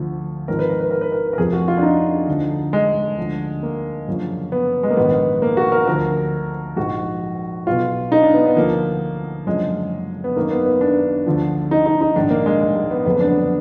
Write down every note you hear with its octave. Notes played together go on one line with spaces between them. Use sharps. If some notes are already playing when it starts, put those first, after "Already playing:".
Already playing: D2 D3 F3
G#1 G#2 F3 A#4
B4
A#4
B4
A#4
B4
A#4
A#4
F1 F2 F3 G#4
F#4
F4
D4
D#4
D2 D3 F3
G#3
D2 D3 F3
A#3
F#1 F#2 D3 F3
B3
G#3
A#3
A#1 G#2 D#3 B3
A#3
F#4
A#4
D2 D3 F3 A#4
A#1 G#2 F3 F#4
B1 B2 F4
D#4
D4
B3
B3
D2 D3 F3 A#3
F#1 F#2 D3 F3 G#3
B3
G#1 F#2 D#3 A#3
B3
B3
D4
D2 D3 F3
D#4
D#4
D#4
A#1 G#2 D#3 D4
A#3
G#3
G#3
G#3
B3
F#1 F2 D3 B3
D4
B3